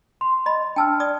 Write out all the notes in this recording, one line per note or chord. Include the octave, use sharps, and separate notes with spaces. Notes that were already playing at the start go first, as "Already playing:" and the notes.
C6
D#5 B5
D4 G5 A5 E6 F6
D5 D#6